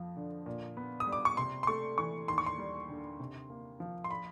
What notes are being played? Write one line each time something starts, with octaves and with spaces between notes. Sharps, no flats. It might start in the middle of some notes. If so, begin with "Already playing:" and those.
Already playing: F2 F3
D3
A#2
B3
D#6
G3
D6
C#6
C3 C6
C6
A3 C#6
E3 C#6
D#2 C6
C#6
C6
G3
D3
C3
A#3
F3
C6
B5